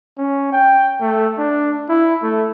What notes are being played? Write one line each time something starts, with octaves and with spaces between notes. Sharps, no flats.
C#4
G5
A3
D4
E4
A3